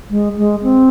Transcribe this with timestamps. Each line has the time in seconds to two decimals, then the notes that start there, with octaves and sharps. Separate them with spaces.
0.10 G#3
0.37 G#3
0.63 C4